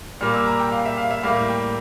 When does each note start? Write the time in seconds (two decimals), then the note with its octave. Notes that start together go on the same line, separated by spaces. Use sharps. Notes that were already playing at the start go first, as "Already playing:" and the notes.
0.21 A#2 G3 A#3 F6
0.34 E6
0.46 A#5
0.59 G5
0.72 F5
0.85 E5
0.97 F5
1.11 E5
1.23 A2 G3 A#3 F5
1.49 G5